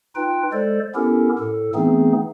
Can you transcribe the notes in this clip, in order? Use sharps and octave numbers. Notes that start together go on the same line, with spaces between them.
D#4 F4 B4 G5
G#3 A4 C5 D5
B3 C#4 E4 G4 A4 A#4
A2 A4
E3 A3 B3 C4 D#4 G#4